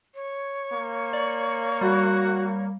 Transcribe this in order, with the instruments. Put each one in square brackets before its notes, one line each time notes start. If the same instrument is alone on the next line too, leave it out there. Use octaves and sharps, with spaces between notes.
[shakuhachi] C#5
[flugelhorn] A#3
[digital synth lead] D5
[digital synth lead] G3 [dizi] F#4